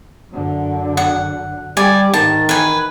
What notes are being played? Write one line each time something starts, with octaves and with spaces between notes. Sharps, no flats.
F#2 D3
F#5
G3 D5 G#5
G#2 D#3 A5
E3 B4 G#5